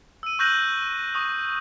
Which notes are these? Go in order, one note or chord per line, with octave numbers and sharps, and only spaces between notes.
E6 D#7
C#6 E6 F#6 G6 A#6 F#7
C#6 D#6